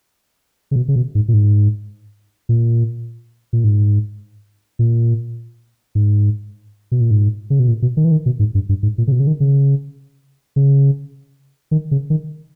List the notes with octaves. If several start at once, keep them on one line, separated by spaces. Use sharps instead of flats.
C#3
B2
C#3
B2
G#2
A#2
G#2
A#2
A#2
G#2
A#2
G#2
B2
A#2
G#2
C#3
B2
A#2
B2
D#3
E3
D#3
B2
G#2
G2
G2
G#2
A#2
C#3
B2
C#3
D#3
C#3
C#3
D#3
C#3
D#3